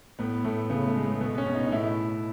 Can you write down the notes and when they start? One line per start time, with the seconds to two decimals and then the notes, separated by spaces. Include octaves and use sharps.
0.19 A2 B3
0.44 A2 A3
0.70 C#3 B3
0.87 A3
0.96 G#3
1.04 A3
1.21 B2 B3
1.38 C#4
1.46 B2
1.55 D#4
1.66 D#4
1.72 A2 E4